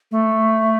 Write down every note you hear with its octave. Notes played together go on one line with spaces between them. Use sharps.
A3